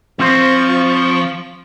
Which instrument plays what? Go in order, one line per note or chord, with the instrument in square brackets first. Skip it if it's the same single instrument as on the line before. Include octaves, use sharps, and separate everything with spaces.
[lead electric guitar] F3 [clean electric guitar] C4 C5 [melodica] F4 C#6